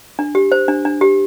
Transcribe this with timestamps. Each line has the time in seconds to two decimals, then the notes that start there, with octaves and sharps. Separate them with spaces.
0.19 D4
0.35 G4
0.52 C5
0.68 D4
0.85 D4
1.01 G4